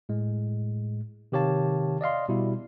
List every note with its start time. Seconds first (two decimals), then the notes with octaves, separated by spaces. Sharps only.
0.09 A2 G#3
1.32 C3 D#3 G4 C#5 F5 A5
2.01 D5 D#5 F5 C6
2.29 B2 G3 E4